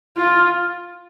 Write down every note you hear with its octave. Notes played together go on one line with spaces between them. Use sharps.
F4